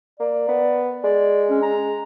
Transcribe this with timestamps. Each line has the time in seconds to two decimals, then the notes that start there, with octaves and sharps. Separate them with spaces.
0.20 A#3 D5
0.49 B3
1.04 G#3 D5
1.50 C#4
1.62 A#5